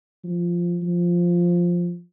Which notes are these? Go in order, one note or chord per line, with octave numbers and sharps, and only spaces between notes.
F3
F3